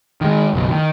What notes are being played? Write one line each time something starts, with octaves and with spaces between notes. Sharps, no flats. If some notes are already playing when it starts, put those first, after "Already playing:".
D#3 G#3
F#1 B1 B2
D#3